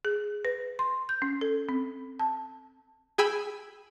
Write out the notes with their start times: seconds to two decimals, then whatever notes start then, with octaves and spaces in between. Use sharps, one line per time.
0.05 G#4
0.45 B4
0.79 C6
1.09 G6
1.22 C#4
1.41 A4
1.69 C4
2.19 A5
3.18 G#4 G5 G#5 B5 E6